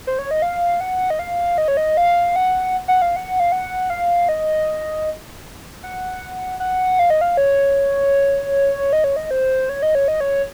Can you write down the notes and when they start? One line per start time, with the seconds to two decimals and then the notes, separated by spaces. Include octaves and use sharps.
0.07 C5
0.19 C#5
0.31 D#5
0.42 F5
0.81 F#5
1.10 D#5
1.19 F5
1.58 D#5
1.68 C#5
1.77 D#5
1.97 F5
2.36 F#5
2.88 F#5
3.02 F5
3.16 F#5
3.40 F5
3.52 F#5
3.90 F5
4.29 D#5
5.83 F#5
6.60 F#5
6.99 F5
7.10 D#5
7.21 F5
7.37 C#5
8.93 D#5
9.04 C#5
9.16 D#5
9.31 C5
9.69 C#5
9.82 D#5
9.95 C#5
10.08 D#5
10.20 C#5